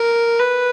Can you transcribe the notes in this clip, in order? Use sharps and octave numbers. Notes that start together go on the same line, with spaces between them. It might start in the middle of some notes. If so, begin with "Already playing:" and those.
Already playing: A#4
B4